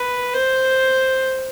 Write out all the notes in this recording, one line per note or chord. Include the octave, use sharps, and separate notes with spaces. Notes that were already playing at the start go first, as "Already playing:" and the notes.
Already playing: B4
C5